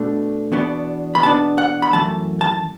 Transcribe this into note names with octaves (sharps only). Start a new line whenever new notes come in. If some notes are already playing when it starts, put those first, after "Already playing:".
Already playing: B2 A3 D4
E2 B2 B3 D4
B5
E2 B2 B3 D4 A5
F#5
B5
F#2 E3 A3 A5
A5